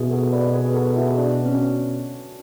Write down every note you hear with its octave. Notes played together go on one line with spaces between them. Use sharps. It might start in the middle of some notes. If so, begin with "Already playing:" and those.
Already playing: B2 E4 G#4
F#4 A4
B4 D5
G#4 B4
F#4 A4
E4 G#4
D4 F#4
C#4